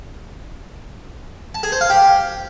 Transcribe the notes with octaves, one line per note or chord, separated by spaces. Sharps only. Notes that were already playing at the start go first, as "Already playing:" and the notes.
A5
G#4
C5
F5
G4